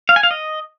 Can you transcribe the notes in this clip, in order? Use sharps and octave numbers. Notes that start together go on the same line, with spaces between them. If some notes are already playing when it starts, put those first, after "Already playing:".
F5
G#5
F5
D#5